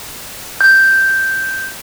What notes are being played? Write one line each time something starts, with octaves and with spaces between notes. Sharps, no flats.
G6